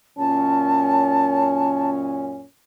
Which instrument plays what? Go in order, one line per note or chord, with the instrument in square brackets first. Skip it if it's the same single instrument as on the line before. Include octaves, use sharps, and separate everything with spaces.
[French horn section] F#2 A#2 C#4 [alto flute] A5